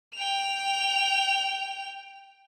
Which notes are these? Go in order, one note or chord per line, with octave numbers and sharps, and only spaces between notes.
G5 F7